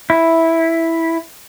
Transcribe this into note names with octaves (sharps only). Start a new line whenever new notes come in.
E4